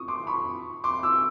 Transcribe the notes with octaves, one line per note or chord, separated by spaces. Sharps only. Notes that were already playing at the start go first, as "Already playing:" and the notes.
Already playing: C#6 D#6
C6 D6
B5 C#6
C6 D6
D6 E6